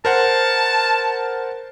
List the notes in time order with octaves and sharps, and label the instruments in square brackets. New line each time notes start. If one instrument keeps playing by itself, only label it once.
[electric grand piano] A#4 C5 F#5 [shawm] A5